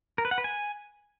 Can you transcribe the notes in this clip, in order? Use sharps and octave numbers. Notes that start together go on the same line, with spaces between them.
A#4
B4
F#5
B4
G#5